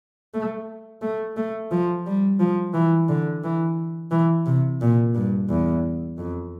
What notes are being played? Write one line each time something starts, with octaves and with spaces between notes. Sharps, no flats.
A3
A3
A3
F3
G3
F3
E3
D3
E3
E3
C3
A#2
G2
E2
F2